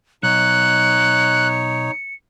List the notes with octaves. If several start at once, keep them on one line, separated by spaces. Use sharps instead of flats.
B1 D#4 C#5 F#6 C#7